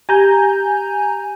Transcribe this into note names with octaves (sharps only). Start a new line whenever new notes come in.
G4 G#5 A#5 G6